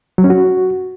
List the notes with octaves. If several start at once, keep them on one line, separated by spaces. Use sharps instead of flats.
F#3
C#4
F#4